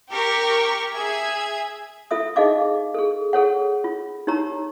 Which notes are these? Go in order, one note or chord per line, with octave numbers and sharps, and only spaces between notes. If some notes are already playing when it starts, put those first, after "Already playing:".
G4 A#4 C#6
G#4 E5 G#6
F4 A4 E5 D#6
D#4 G#4 D#5 F5 D6
G#4 A4
G#4 A4 C#5 F#5
F4
D#4 G4 C#5 A#5